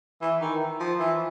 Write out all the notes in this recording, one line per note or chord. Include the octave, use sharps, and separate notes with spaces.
E3
D#3
F3
E3